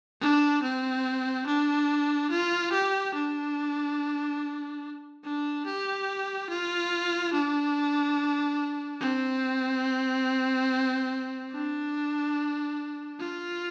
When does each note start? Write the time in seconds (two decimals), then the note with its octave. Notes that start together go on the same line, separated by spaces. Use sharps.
0.21 D4
0.62 C4
1.46 D4
2.30 F4
2.72 G4
3.14 D4
5.24 D4
5.66 G4
6.50 F4
7.33 D4
9.01 C4
11.51 D4
13.20 F4